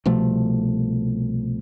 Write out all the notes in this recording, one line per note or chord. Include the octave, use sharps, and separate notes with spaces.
C2 B2 F3 A3